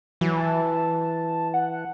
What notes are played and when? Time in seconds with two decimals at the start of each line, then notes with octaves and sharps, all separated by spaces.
0.21 E3 F#3
0.37 A5
1.54 F#5